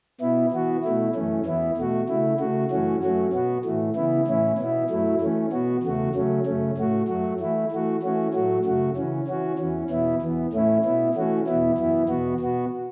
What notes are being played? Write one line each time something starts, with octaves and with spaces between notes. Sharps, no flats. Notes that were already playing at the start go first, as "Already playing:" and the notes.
B2 B3 E4
E3 B3 F#4
B2 A3 E4
F#2 E3 A3 C#4
E2 E3 B3 E4
B2 A3 F#4
C#3 A3 E4
C#3 A3 F#4
F#2 E3 A3 C#4 F#4
F#2 F#3 A3 C#4 F#4
B2 B3 F#4
A2 E3 A3
C#3 E3 B3 E4
A2 E3 C#4 E4
B2 B3 E4
F#2 F#3 A3 E4
E3 A3 C#4
B2 B3 F#4
E2 C#3 A3 F#4
C#3 F#3 A3 C#4
F#2 C#3 A3 C#4
A2 A3 F#4
F#2 F#3 A3 F#4
E3 A3 E4
E3 A3 F#4
E3 A3 C#4 F#4
A2 F#3 A3 F#4
F#2 C#3 A3 F#4
C#3 E3 C#4
E3 C#4 F#4
E2 E3 C#4
E2 B2 B3 E4
E2 E3 B3
A2 A3 C#4 E4
B2 B3 E4
E3 A3 C#4 F#4
E2 B2 B3 E4
F#2 E3 B3 E4
E2 B2 B3 F#4
B2 B3 F#4